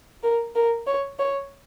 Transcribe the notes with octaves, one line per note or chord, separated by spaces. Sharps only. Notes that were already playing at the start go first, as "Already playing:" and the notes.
A#4
A#4
C#5
C#5